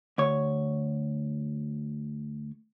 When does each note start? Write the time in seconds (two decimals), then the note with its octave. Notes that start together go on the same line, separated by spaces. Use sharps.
0.18 D2 C#5